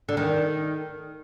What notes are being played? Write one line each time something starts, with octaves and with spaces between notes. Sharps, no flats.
D3
D#3